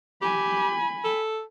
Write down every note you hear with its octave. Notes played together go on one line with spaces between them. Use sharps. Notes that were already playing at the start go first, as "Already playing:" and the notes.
G4 G#5 B5
A4